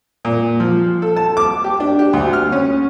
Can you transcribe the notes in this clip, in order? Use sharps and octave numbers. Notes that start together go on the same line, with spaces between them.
A#2
F3
A4
A5
D6
G4
D4
G4
D2
F6
C#4